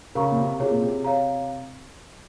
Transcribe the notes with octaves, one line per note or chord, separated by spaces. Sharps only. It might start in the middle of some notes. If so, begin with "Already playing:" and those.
C#3 A#4 F5 A#5 C#6
A#2
C3
C3 F4 G#4 C#5
A#2
C3
C#5 F5 A#5